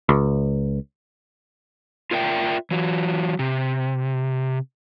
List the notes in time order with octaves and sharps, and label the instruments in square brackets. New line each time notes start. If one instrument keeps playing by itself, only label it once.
[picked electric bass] C#2
[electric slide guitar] F4 A#4 D5 E5 G5
E3 F#3
C3